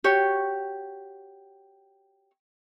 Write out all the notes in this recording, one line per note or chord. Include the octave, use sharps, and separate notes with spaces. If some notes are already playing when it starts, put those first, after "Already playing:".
F#4 G4 C#5